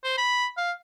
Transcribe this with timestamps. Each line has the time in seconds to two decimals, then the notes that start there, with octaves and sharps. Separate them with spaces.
0.04 C5
0.18 B5
0.57 F5